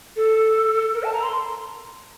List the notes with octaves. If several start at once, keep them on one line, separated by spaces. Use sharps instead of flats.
A4
A#4
A5
A#5
C6